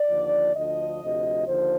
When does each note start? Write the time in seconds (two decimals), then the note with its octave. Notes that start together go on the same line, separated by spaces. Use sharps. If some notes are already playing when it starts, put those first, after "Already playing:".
Already playing: D5
0.08 D#2 D3 F3
0.54 D2 D3 F3 D#5
1.01 D2 C3 F3
1.46 D#2 D3 F3 C5